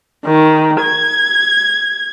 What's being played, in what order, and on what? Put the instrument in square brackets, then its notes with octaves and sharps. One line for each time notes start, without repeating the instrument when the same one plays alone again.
[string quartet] D#3
G#6